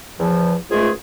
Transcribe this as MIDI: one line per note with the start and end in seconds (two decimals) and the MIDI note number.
0.20 0.54 40
0.20 0.54 53
0.71 0.91 37
0.71 0.91 44
0.71 0.91 56
0.71 0.91 57
0.71 0.91 65
0.71 0.91 68